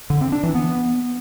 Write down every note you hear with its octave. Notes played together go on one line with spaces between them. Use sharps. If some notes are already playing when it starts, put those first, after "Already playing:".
D3
C4
D4
E3
B3